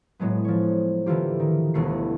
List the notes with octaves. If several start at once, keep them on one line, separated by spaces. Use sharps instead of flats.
A2 F#3 G#3 B3
F3 C#5
D3 E3 A#3 F4 G4
D#3
E1 D2 A3 B3 C7